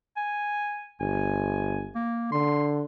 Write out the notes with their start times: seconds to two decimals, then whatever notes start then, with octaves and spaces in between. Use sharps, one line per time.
0.17 G#5
1.00 G1 G#5
1.95 A#3
2.32 D3 C6